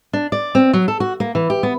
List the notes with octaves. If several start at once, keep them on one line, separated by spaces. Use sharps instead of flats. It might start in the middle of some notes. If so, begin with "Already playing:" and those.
D4
D5
C4
F#3
A4
F#4
A#3
E3
G4
B3